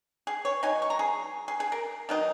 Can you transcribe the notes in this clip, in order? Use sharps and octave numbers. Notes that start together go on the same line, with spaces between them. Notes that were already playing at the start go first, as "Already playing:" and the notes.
G#4
C#5
F#3 D#4 G#5
C#6
A#5
G#4
G#4
G#4
A#4
D#3 F#3 D#4